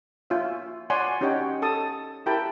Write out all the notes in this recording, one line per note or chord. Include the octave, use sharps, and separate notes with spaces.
F4 C#5 E5
C#5 D5 F#5 G#5 C6
C#4 D#4 G4 C#5 F#5 G5
A4 A5 D#6
E4 G4 A#4 G5 A5 B5